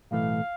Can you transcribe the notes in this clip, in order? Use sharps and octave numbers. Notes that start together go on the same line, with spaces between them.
B1 A2 E3 A3 F5